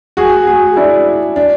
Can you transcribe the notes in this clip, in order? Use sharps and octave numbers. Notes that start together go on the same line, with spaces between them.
F#4 G#4
F#4 G#4
D4 E4
D4